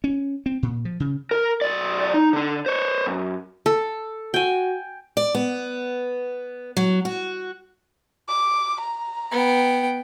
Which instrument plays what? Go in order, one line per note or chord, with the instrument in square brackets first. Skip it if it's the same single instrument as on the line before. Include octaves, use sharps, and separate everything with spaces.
[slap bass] C#4
C4
A#2
F3
C#3
[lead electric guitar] A#4
B1 D5
D#4
D3 D4
C5 C#5
F#2
[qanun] A4
[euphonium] F#4 [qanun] G5 G#5
[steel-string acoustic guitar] D5
B3
F#3
F#4
[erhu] D6
A#5
[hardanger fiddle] B3 G5